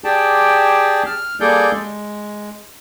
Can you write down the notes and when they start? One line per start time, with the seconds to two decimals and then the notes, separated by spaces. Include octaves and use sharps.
0.04 G4 G#4 D5 G5 A5
1.06 F6
1.40 G3 A#3 G#4 A4 D5 G6
1.72 G#3